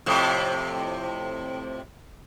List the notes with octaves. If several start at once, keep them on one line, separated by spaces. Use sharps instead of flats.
F2 A2 C3